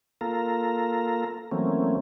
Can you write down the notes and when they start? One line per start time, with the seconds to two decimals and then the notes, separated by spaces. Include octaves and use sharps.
0.21 A#3 F4 A4 A#5
1.51 E3 F#3 A3 A#3 C4 C#4